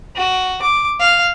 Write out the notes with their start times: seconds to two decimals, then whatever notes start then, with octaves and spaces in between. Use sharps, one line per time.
0.16 F#4
0.62 D6
1.00 F5